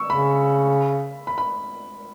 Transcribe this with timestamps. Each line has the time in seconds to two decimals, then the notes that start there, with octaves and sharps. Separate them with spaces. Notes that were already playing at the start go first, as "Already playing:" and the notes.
Already playing: C#6 E6
0.10 C#3 B5
1.27 B5
1.38 B5